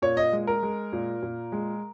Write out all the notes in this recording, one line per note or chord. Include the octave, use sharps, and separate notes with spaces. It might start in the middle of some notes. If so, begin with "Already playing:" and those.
A#2 C#5
D#5
G#3
A#4
G#3
A#2
A#2
G#3